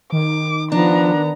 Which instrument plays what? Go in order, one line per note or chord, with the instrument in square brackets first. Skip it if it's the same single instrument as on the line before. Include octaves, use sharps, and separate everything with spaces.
[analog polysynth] D#3 [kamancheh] D6
[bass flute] F3 [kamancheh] B3 A#5 [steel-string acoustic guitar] D4